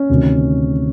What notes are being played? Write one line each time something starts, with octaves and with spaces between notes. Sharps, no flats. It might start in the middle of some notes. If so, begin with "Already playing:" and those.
Already playing: C#4
D2 C3 D#3